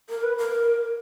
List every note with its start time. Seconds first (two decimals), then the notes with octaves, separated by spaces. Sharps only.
0.10 A#4
0.23 B4
0.38 A#4